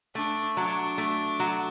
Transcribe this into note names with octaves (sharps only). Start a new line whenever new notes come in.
A3 D4
F#3 D4
A3
F#3